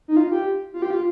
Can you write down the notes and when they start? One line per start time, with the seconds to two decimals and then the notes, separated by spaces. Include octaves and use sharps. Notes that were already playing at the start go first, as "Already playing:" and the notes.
0.08 D#4
0.17 F4
0.31 G4
0.74 F4
0.82 G4
0.90 F4